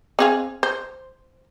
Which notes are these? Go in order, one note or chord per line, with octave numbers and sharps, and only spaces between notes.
C4 G#4 F5
C5